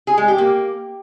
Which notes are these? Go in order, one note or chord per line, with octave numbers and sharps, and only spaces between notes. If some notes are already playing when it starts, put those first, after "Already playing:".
G#4
G#3
G4
A#3